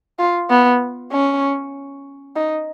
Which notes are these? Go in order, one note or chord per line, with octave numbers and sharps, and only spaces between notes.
F4
B3
C#4
D#4